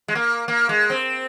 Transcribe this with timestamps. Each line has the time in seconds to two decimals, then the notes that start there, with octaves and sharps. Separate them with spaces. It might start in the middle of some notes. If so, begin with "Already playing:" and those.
0.08 G#3
0.15 A#3
0.48 A#3
0.69 G#3
0.90 C4